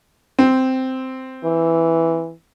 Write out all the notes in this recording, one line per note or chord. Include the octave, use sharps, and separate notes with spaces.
C4
E3